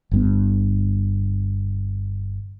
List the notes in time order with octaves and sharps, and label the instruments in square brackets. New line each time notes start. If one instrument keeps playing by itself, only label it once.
[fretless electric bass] G1 G2 B3